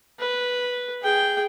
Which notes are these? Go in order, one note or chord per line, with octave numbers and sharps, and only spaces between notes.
B4
G#4 G5